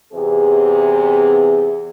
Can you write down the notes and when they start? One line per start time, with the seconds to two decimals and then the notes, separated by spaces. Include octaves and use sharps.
0.13 E2 C3 G#4